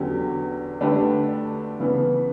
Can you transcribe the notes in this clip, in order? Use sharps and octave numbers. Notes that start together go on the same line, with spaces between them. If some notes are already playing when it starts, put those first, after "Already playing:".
Already playing: E2 D3 F#3 C#4 G4
D3 A3 D4 G4 B4
C#3 E3 B3